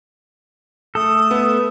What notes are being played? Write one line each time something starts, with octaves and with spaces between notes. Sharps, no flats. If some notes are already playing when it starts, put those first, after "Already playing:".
A3 A4 D#6
B3